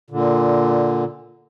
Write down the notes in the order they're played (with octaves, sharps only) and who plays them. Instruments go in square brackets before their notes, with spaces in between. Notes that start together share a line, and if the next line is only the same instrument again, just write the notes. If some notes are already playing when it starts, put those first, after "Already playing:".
[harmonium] A#2 D3